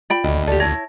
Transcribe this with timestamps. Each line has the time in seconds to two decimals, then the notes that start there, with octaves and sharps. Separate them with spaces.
0.10 F4 D5 G5 B5
0.24 D2 D#5
0.47 G4 A4 D5
0.60 E4 C#5 A5 A#6